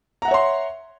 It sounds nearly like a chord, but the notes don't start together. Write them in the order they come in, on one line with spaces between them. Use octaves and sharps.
A#5 F#5 E5 C#5 C6